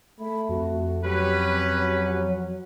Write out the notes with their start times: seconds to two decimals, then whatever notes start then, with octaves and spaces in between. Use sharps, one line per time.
0.20 A3 B5
0.49 F2 F#4
1.04 F#3 C#4 G4 B4